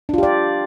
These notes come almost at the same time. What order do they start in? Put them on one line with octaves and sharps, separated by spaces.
D4 F4 G4 D5